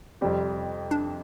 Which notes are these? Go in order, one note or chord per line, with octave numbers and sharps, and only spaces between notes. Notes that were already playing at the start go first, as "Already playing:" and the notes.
F2 C3 G3 C4 G4
D4